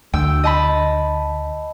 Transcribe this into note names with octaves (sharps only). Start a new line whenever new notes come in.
D2 G5 E6
D#5 A5 B5